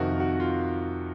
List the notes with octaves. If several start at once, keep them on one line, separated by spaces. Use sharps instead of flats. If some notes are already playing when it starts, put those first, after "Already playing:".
Already playing: F2 C3 D#3 F#4 A#4
F#4
F4